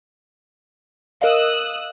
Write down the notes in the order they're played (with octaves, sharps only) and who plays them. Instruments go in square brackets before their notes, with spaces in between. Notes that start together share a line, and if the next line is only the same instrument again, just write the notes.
[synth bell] A#4 D#5 F5 [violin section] D#6 E6 F#6